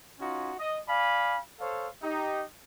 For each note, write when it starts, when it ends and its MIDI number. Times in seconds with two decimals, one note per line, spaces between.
0.19 0.52 61
0.19 0.52 63
0.19 0.52 65
0.19 0.52 66
0.58 0.78 75
0.87 1.38 74
0.87 1.38 77
0.87 1.38 80
0.87 1.38 83
1.59 1.87 69
1.59 1.87 72
1.59 1.87 73
1.59 1.87 77
2.02 2.43 63
2.02 2.43 67